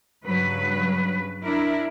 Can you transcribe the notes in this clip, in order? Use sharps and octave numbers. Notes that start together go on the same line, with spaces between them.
G2 C#3 F#3 B4
D4 E4 A#4